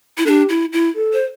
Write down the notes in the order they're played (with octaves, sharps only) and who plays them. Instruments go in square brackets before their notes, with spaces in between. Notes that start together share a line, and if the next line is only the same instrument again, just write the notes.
[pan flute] E4
[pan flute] D4 [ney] G4 A4
[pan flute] E4
E4
[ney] A4
[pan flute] C5